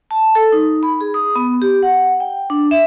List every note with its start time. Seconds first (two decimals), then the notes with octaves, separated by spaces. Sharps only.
0.11 A5
0.35 A4
0.52 D#4
0.83 B5
1.01 G#4
1.14 D#6
1.36 B3
1.62 G4
1.83 F#5
2.20 G5
2.50 D4
2.71 E5